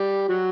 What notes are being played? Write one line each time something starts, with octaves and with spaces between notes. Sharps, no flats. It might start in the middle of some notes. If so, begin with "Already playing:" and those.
Already playing: G3 G4
F#3 F#4